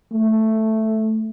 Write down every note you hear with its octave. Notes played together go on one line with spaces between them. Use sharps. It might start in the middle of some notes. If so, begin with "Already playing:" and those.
A3